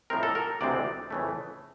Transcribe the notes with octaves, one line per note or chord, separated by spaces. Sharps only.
A2 F3 G#3 C4 A#4
A4
A#4
D2 C3 E3 G#3 C4 D5
F2 C#3 E3 A3